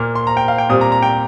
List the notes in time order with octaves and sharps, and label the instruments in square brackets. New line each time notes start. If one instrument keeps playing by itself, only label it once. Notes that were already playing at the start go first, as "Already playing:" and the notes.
Already playing: [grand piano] A#2 A#3 F6
C6
A#5
G5
F5
G5
A#2 G3 C4 D#6
A#5
A#5
G5